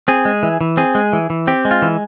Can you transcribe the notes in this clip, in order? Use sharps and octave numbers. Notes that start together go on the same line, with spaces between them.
C4 G#4
G#3
E3
E3
C4 G#4
G#3
E3
E3
C4 G4
G#3
F4
E3